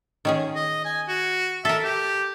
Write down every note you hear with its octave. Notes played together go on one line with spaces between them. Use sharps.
D#3 C#4 G#4
D#5
G#5
F#4
A4 A#4 E5
G4